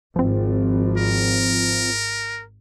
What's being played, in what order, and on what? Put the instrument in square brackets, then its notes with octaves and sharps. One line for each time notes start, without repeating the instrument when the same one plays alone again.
[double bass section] G#1 [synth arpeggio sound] F3 C4
[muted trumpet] A#4